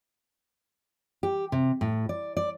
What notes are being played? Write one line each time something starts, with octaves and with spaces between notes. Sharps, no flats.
G4
C3
A2
D5
D5